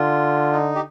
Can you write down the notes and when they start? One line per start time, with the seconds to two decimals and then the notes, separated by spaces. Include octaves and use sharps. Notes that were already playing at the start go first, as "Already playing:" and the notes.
Already playing: D3 F4
0.53 D#4
0.75 G4